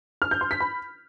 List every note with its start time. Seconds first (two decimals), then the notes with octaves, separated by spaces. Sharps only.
0.22 F6
0.31 G6
0.41 C6
0.51 B6
0.60 B5